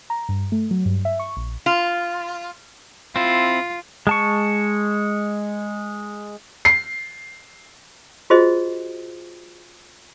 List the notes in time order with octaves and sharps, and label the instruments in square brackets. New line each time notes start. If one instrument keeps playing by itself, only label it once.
[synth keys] A#5
G2
A3
F#3
G2
E5
C#6
A#1
[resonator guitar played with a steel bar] F4
[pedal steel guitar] C4 E4 [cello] F4
[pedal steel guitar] G#3 A5 C#6
[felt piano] C7
[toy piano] F4 F#4 G#4 C5 D#5